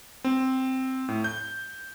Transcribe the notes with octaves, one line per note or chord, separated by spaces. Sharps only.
C4
A2
G6